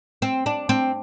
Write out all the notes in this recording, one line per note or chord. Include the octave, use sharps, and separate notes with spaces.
C4
D4
C4